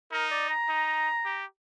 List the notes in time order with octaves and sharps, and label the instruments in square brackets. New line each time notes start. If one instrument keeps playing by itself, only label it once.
[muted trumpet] D#4 [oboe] A#4
[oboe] D5
A#5
[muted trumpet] D#4
G4